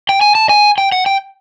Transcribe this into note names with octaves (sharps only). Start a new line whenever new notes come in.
G5
G#5
A5
G#5
G5
F#5
G5